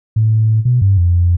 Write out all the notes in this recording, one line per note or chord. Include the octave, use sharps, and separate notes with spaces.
A2
B2
G2
F2